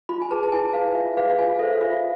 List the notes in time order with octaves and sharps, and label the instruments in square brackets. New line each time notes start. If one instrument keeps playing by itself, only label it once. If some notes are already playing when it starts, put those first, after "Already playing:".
[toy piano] F4 B5
G#5
G#4 B4 A5
A5
E4 G#5
B4 F5
F4 E5
G#4 B4 F5
F5
F4 G#5
A4 C5 E5
F5
F4 E5